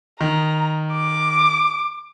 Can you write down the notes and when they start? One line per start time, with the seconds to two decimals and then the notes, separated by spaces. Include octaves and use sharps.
0.21 D#3 A#5
0.93 D6